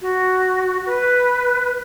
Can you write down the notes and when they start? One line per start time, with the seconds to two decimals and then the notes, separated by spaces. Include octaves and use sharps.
0.01 F#4
0.86 B4